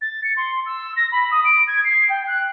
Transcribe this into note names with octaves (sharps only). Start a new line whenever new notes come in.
A6
C#7
C6
E6
A#6
B5
D#6
D7
G#6
C7
G5
F#6